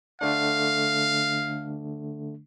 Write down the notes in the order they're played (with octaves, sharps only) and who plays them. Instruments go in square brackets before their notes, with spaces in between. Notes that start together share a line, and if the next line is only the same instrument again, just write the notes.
[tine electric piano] D3 A3 D4 [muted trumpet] F5